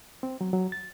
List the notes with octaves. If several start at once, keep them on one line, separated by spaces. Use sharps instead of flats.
C4
F#3
F#3
A6